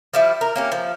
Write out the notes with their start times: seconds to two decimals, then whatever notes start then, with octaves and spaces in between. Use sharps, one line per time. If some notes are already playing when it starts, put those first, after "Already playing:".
0.14 F3 G3 E4
0.41 A#4
0.56 A#3 C#4 G4
0.72 F3